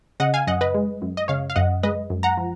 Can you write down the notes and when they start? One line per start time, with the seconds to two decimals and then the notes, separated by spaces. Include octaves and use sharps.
0.20 C#3 D#5 F#5
0.34 F5 G#5
0.47 F#2 D#5 F#5
0.61 B4 D#5
0.74 G#3
1.02 F#2
1.17 D#5
1.28 C#3 C#5 F5
1.50 F5
1.56 F#2 D#5 F#5
1.83 G#3 B4 D#5
2.10 F#2
2.23 F#5 A#5
2.37 F3